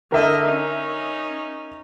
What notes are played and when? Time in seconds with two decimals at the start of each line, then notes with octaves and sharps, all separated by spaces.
0.12 D3 A#4 D#5 E5
0.46 C#4 D#4